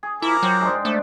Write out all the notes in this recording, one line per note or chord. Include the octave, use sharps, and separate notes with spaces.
G#4
F3 E4 A#4 D6
F#3 C5 G5
G#2 G#3 D4
A3 D4